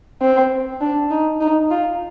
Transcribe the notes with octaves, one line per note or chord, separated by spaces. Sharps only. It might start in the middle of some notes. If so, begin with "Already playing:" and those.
C4
D4
D#4
D#4
F4